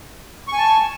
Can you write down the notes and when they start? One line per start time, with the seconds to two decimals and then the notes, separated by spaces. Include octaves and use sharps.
0.48 C#6
0.53 G#5
0.58 A5